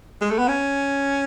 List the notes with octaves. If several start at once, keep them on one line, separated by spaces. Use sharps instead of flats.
G#3
A3
B3
C#4